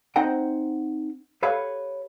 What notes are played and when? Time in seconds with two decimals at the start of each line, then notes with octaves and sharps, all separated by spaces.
0.16 C4 D#4 C5 F#5 G5
1.43 G4 A4 B4 C#5 F5